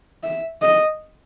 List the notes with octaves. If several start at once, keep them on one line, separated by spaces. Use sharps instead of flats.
E5
D#5